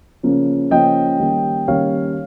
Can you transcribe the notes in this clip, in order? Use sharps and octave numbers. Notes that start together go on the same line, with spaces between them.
C#3 F3 A#3 C#4
C#3 F3 A#3 C#4 D#5 G5
D#3 G3 A#3 C#4
D#3 G3 A#3 C#4 C#5 F5